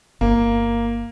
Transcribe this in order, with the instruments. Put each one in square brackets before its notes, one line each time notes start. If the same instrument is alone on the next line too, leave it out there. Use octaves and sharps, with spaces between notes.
[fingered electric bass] G1 [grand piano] A#3